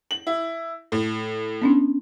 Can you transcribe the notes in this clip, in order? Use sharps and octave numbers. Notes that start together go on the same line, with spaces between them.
F#7
E4
A2
B3 C#4 D4